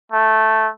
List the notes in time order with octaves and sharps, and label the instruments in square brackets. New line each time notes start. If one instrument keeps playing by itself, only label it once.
[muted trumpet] A3